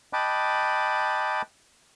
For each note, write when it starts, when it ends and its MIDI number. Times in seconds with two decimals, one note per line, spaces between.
0.13 1.42 75
0.13 1.42 79
0.13 1.42 81
0.13 1.42 83
0.13 1.42 86
0.13 1.42 90